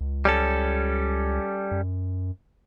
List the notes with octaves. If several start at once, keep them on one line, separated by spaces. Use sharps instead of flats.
C#2
G3 C#4 A4
F#2